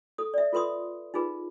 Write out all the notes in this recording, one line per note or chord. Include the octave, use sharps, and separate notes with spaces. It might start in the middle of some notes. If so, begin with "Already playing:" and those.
A4 D#6
D5 E5
F4 A4 B4 C6 D#6
D#4 F4 G#4 B4